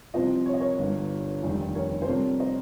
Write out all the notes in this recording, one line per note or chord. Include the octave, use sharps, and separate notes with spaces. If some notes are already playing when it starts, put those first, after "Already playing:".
C2 C3 F3 C5 D#5
C#5
D#5
A#4 C#5
G1 G2 G3
F1 D#2 D#3 G3
A#4 C#5
C5
F2 C3 G3 A#4 C#5
C5 D#5